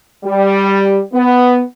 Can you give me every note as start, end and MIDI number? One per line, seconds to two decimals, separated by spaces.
0.24 1.01 55
1.13 1.62 59